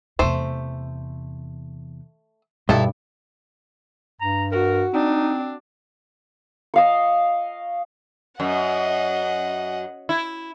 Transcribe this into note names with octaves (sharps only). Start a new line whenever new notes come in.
E2 C3 A3 C5
G2 B2 D#3 E4 A4
G2 A#5
F#4 A#4
C4 D4 D#4
D#5 F5 C#6
F#2 D#5 F#5
E4